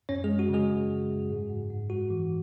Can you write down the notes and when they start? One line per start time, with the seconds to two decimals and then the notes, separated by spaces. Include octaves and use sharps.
0.09 F#2 C#4 C#5
0.24 G#3 G#4
0.29 F#2
0.39 F#4
0.49 C#3 G#3 G#4
0.70 G#3
0.90 F#2
1.10 F#2
1.30 G#2
1.50 G#2
1.70 G#2
1.90 G#3 F#4
2.10 E3